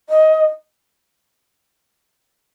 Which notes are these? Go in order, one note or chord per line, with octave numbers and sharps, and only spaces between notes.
D#5